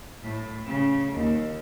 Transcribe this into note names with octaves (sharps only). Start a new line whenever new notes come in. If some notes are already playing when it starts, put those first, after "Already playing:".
A2
C#3
D#2